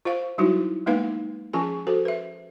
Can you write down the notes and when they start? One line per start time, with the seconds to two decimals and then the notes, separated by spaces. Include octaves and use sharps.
0.05 F4 C5 F5
0.38 F#3 G3 D#4 E4 F#4
0.86 G#3 A#3 B3 D#4 B4 F5
1.53 F3 C#4 F4 G#4 G#5
1.87 F#4 A4 C5
2.05 B4 E5